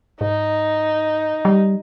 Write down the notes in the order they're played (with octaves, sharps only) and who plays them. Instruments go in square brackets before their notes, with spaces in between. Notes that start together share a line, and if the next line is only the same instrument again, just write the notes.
[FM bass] G#2 [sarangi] D#4
[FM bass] G3